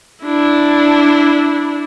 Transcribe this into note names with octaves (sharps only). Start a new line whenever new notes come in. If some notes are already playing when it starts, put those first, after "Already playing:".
D4 E4